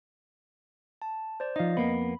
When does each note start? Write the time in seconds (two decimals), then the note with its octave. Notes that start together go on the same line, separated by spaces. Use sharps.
1.02 A5
1.40 C5 D5
1.56 F3 D#4 D#5 F5
1.77 F2 A#3 B3 B5